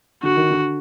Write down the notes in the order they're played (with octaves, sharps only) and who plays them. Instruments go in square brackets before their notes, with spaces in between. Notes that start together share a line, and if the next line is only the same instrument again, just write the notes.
[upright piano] D3 [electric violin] F#4
[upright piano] D#3
D3